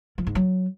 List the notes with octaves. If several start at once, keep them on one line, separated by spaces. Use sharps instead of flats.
F3
G#2
F#3